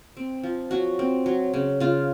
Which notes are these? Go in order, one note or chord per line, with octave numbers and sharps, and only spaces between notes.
C4
F3
F#3 F#4
C4
F#3
C#3
C#3 F4